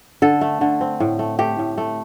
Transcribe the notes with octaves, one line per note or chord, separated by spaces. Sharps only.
D3 A4
A3
D3
C4
A2
A3
A3 G4
A2
A3